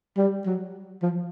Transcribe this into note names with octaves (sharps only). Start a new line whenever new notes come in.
G3
F#3
F3